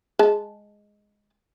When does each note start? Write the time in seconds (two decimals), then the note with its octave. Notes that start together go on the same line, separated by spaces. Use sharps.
0.19 G#3 A5